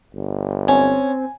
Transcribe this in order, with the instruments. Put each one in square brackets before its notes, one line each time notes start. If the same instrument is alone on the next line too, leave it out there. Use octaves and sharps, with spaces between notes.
[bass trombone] G1
[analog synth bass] C4 [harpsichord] C#4 [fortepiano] G#5